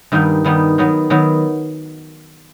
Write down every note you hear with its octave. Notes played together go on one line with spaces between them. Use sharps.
G2 D#3 G3 B3 D#4
G2 D#3 G3 B3 D#4
D#3 F#3 B3
D#3 F#3 B3